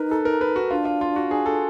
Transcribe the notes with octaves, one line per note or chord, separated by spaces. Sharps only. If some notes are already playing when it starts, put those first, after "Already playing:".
Already playing: D#4 A#4 B4
A4
A#4
B4
F#4
D4 F4
F4
F4
F#4
G#4
A4